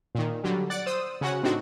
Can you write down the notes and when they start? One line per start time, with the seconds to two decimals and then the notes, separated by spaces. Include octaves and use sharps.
0.15 A#2 D#3
0.44 D3 F#3 G3
0.70 D5 F#5 F#6 A6
0.86 C5 D#6 E6
1.21 C#3 C#4 F#4 F#5
1.43 A2 C4 D4 D#4 F#4